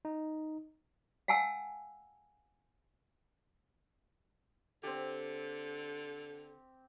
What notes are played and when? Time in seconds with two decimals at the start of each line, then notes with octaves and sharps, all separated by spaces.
0.05 D#4
1.28 F5 F#5 G#5 A5 E6
4.83 D3 C4 G4